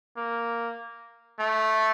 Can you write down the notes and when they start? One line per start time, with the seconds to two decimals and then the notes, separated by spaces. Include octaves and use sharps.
0.17 A#3
1.39 A3